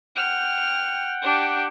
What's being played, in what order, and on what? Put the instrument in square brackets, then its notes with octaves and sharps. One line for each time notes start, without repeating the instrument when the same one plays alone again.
[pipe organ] F#5 G5 [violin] F6
[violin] D4 G4